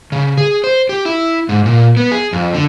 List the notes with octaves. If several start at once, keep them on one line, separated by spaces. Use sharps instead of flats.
C#3
G#4
C5
G4
E4
G#2
A#2
B3
G#4
F2
D3